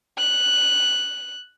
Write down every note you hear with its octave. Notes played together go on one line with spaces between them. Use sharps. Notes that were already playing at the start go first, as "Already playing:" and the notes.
F#6